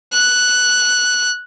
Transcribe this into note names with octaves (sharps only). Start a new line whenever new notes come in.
F#6